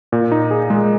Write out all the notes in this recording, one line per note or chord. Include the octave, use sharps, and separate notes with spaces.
A#2
D#4
G#4
G#3